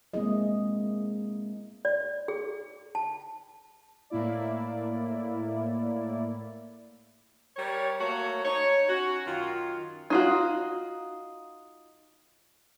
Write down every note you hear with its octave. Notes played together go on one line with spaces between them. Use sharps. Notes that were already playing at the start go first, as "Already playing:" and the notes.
G#3 A#3 C4 E4 G#4 D#5
D5
G#4
A5
A2 A#3 E4 D5
G3 A#4 C#5
A3 A#3 F#4 C#5
D#4 C#5
C#4 F#4
F#2 D#3 F4
D#4 F4 F#4